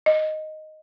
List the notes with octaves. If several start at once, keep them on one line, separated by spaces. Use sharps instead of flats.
D#5